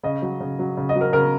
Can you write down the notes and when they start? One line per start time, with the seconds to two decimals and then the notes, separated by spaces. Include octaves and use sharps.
0.03 C#3 D#5
0.22 F#3
0.40 C#3
0.59 F#3
0.77 C#3
0.89 D#5
0.95 F#3
1.01 A#4
1.13 C#3 A#4